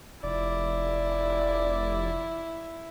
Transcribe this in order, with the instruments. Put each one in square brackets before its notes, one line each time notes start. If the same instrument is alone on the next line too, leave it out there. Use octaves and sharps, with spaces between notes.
[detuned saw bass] F1 [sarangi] E4 [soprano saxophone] D5